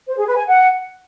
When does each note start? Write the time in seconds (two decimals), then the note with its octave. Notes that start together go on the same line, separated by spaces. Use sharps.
0.08 C5
0.18 G#4
0.27 B4
0.37 G#5
0.47 F#5